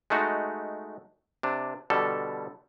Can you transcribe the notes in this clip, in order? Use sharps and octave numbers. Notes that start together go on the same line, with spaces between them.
G#3 A3 D#4 F#4
C3 D4
B2 D3 G3 A4